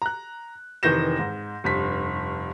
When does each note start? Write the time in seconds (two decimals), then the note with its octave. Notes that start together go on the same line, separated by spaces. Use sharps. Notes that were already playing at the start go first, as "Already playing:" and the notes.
0.02 A#5 F#6
0.83 F1 D#3 E3 G6 A#6 E7
1.19 G#2
1.64 F1 G2 B6